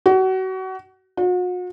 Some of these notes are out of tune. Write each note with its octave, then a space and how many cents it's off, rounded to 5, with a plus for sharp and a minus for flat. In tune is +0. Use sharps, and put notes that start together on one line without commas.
F#4 +30
F#4 -40